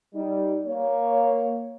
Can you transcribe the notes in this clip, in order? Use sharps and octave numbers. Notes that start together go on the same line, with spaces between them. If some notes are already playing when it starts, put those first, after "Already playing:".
G3 D#4
A#3 C#5